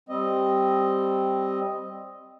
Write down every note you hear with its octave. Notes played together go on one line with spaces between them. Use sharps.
G3 C4 D#5